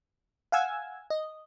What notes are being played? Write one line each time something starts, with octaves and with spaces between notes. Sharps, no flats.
F5 F#5 G#5 E6 G#6
D#5